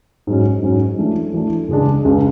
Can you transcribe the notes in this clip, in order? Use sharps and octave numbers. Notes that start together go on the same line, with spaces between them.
G#2 F#3 C#4
G#2 F#3 C#4
E3 A3 D4
E3 A3 D4
C#2 C#3 G#3 D4
C#2 C#3 G#3 D4